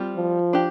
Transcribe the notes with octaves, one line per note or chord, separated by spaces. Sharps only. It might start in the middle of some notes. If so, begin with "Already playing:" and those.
Already playing: G3 C4 F4
F3
D4 G4